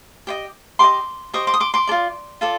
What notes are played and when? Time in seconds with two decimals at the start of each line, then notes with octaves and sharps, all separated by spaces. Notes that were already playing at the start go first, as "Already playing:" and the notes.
0.27 G4 C5 D#5
0.79 G4 C5 D#5 C6 D6
1.33 G4 C5 D#5 C#6 D#6
1.47 C6 D6
1.54 D#6
1.60 C6 D6
1.74 C6 D6
1.87 A4 D5
1.91 F4
2.41 F4 A4 D5